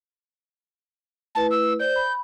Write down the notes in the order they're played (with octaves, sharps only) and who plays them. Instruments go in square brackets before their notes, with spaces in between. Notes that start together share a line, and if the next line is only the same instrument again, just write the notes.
[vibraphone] A3 E4 B4 [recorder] A5
[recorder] E6
[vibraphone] C5 D5 [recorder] G6
[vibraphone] B5